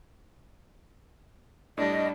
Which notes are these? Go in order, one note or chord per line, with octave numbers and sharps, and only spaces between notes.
A2 G3 D4 D#5